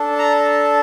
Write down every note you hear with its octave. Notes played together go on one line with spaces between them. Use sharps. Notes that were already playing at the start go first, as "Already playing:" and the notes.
Already playing: D4 A4
A#5